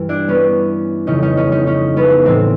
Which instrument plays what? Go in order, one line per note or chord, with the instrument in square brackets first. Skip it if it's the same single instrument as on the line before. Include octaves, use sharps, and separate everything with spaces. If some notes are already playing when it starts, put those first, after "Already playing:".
Already playing: [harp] G2 E3
D4 E4
B3 C#4
F2 C#3 E3 C#4 D#4
C#4 D#4
C#4 D#4
C#4 D#4
C#4 D#4
B3 C#4
A2 E3 C4